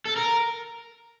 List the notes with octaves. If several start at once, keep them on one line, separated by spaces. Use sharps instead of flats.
A4
A#4